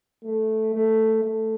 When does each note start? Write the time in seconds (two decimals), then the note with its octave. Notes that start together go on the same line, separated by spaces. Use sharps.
0.24 A3
0.74 A3
1.24 A3